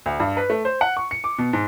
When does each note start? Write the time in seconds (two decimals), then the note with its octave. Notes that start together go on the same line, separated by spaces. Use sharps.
0.06 D2
0.20 G2
0.37 B4
0.50 A3
0.65 C5
0.81 F#5
0.97 C#6
1.11 C#7
1.24 D6
1.38 B2
1.53 G#2